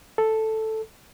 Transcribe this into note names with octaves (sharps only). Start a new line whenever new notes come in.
A4